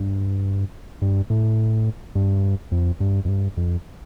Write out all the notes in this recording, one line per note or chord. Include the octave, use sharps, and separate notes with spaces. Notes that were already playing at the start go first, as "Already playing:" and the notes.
Already playing: G2
G2
A2
G2
F2
G2
F2
G2
F2